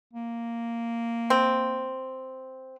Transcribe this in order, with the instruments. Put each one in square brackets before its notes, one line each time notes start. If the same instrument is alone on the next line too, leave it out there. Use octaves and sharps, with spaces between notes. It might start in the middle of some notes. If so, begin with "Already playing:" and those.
[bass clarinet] A#3
[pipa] C4